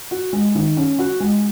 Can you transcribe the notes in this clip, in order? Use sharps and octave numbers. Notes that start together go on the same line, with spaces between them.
F#4
G#3
D#3
C#4
F#4
G#3